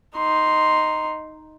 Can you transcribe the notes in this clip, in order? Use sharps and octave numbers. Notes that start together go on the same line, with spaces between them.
D#4 C6